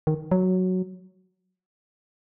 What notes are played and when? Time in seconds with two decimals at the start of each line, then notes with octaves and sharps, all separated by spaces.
0.07 D#3
0.31 F#3